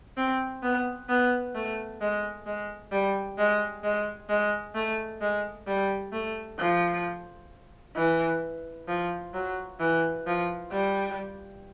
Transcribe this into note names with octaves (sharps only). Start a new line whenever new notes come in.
C4
B3
B3
A3
G#3
G#3
G3
G#3
G#3
G#3
A3
G#3
G3
A3
F3
E3
F3
F#3
E3
F3
G3